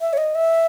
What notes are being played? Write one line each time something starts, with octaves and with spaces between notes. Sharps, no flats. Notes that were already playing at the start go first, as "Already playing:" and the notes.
E5
C#5
D#5
E5